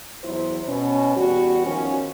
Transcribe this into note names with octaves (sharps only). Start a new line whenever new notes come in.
E2 F#3 E4 C5
B2 C#4
E2 G3 F#4
D#3 F3 C#4